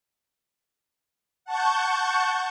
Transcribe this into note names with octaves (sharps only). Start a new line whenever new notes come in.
F#5 A5 C#6 G6